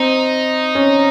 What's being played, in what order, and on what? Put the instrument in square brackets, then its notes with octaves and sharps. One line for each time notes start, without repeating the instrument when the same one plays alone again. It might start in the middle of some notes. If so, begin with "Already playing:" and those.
Already playing: [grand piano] C4 [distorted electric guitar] D#4
[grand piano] C#4